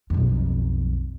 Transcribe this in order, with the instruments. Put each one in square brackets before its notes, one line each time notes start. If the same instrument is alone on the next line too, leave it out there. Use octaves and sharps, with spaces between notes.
[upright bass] B1 F2